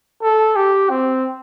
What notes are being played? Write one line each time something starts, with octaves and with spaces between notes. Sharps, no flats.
A4
G4
C4